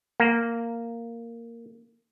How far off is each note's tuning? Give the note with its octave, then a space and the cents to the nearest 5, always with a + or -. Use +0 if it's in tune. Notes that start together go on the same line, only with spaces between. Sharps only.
A#3 -5